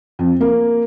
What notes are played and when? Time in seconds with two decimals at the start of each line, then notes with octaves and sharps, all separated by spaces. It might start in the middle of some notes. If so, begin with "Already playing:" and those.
0.19 F2
0.41 A#3